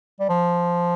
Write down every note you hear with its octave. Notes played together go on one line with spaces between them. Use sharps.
G3
F3